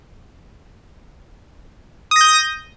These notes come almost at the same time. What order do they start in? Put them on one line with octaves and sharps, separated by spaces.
D#6 A#6 G6